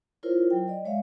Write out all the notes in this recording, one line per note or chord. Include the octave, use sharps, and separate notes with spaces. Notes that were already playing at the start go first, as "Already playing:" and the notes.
E4 F4 A#4 C5 C#5
F#3 G5
D5 D#5
G#3 C#5 E5 F5